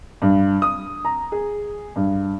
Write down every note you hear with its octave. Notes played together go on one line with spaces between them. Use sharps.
G2
D#6
A#5
G#4
G2